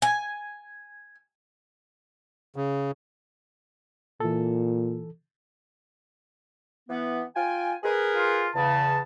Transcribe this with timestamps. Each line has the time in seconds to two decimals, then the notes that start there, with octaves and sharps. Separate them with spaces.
0.02 G#5
2.56 C#3
4.20 A#2 E3 A4
6.89 E3 B3
7.36 F4 G5 G#5
7.84 G#4 A#4 B4
8.16 F4
8.55 E2 C#3 A5